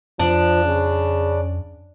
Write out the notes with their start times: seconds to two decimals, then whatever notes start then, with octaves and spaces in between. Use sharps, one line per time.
0.19 F2 F3 D4
0.65 C#3